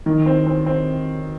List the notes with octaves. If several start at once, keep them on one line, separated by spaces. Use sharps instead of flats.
D#3
C4
C4
C4